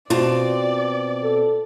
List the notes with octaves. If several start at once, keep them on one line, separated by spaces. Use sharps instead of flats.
B2 C4 F4 D5 A5
A4